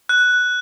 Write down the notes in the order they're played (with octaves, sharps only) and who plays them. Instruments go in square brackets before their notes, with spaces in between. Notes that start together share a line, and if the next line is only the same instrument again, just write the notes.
[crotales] F#6